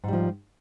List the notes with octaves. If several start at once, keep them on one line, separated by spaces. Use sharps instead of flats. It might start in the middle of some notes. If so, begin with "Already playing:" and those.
G#2 F3 G3